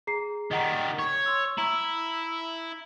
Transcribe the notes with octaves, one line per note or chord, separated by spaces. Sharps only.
G#4 A#5 C7
D#3 G3 D#5 F#5 A#5
C#5
C6 E6
E4 A#5 E6